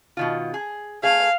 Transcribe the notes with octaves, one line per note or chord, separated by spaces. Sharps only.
B2 D#3 F4
G#4
A3 G#4 F5